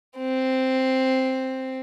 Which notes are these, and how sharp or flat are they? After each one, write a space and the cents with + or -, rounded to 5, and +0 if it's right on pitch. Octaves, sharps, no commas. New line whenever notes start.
C4 +0